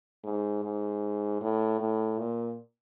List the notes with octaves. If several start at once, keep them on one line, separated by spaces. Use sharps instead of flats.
G#2
G#2
A2
A2
A#2